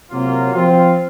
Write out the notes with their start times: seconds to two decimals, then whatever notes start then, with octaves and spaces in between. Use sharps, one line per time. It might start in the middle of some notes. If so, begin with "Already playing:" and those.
0.11 C3 F#3 A#3 F4
0.53 F3 C4 F4